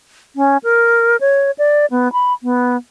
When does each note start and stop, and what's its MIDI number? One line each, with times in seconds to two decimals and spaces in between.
0.36 0.57 61
0.64 1.17 70
1.21 1.51 73
1.58 1.86 74
1.91 2.11 59
2.13 2.33 83
2.43 2.77 59